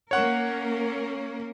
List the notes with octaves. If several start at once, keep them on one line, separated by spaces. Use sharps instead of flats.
A#3 C#4 A#4 C#5 F#5 C#6